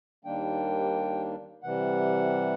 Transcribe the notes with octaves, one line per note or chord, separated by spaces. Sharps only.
D#2 D#3 G3 A#3 D4 G5
C3 E3 G3 F#5